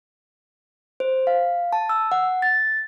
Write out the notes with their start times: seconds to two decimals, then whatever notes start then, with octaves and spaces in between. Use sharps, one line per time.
1.00 C5
1.27 F5
1.73 A5
1.89 E6
2.12 F#5
2.42 A6